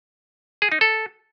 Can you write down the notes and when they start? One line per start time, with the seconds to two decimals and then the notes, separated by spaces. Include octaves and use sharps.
0.62 G#4
0.72 D#4
0.81 A4